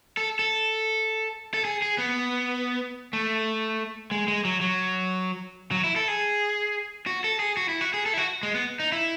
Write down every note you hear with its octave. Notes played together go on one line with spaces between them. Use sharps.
A4
A4
A4
G#4
G#4
B3
A3
G#3
G#3
F#3
F#3
F#3
E4
A4
G#4
F#4
A4
G#4
F#4
E4
F#4
G#4
A4
E4
F#4
G#3
B3
D#4
E4